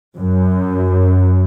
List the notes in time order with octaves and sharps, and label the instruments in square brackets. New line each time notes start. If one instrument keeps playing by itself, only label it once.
[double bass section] F#2